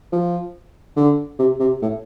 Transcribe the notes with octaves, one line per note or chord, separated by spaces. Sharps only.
F3
D3
C3
C3
A2